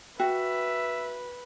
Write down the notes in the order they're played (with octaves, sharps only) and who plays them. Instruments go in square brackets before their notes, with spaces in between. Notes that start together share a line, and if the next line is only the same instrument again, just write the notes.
[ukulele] F#4 [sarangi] B4 [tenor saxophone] E5 [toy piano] G5